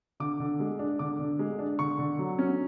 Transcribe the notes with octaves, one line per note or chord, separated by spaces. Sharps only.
D3 D6
D3
G#3
D4
D3 D6
D3
G#3
D4
D3 C#6
D3
F#3
C#4